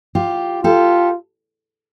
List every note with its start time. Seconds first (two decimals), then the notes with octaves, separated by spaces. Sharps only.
0.15 F4 G4
0.64 F4 G4 A4